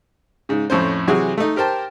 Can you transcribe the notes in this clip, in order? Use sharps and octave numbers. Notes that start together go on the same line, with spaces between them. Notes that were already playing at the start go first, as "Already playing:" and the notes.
G#2 C#3
F2 A2 C#4 C5
C3 E3 F#3 F#4 G#4
A3 D#4
G4 A#4 C5 G5 A5